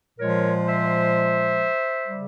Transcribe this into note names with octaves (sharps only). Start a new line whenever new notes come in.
A#2 F3 G#3 A#4 C#5
C5 E5
C#3 G3